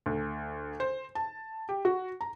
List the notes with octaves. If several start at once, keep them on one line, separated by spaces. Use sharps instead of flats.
D2
C5
A5
G4
F#4
A#5